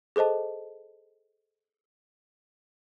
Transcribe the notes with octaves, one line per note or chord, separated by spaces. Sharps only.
G#4 A4 C5 D#5 A5